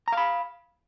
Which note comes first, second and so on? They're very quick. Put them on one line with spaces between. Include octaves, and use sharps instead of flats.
A#5 F5 B5